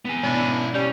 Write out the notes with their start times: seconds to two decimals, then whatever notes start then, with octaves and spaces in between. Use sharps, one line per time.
0.05 B3 G#5
0.23 G#2 B2 C#4 D4 E4
0.74 G3 C#4